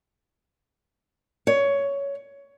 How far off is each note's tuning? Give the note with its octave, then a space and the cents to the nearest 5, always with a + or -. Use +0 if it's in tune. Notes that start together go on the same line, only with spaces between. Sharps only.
C#5 +15